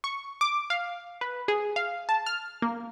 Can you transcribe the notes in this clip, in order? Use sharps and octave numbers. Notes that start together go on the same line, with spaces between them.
C#6
D6
F5
B4
G#4
F5
A5
F6
A#3